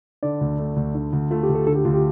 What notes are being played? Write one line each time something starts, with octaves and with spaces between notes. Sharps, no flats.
D3 D5
D2
A3
D2
D3
D2
A3 F4
G4
D2
A4
D3 A4
G4
D2 F4
G4